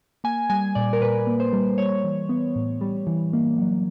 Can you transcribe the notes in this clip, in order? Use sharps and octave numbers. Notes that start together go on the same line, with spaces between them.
A#3 G#5
G3 G#5
A#2 D5
A#4
A#2 B4
A#3
C5
G3
G3 C#5
E3
B3
A2
G3
E3
A#3
F#3